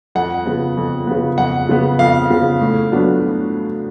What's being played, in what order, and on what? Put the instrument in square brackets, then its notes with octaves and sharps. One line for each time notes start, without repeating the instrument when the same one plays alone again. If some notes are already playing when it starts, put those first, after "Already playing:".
[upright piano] F2 [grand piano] F#5
[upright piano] C#3 F3 B3
F2
C#3 F3 B3
[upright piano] F2 [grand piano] F#5
[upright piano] C#3 F3 B3
[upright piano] F2 [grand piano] F5
[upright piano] C#3 F3 B3
A2
F#3 B3 D4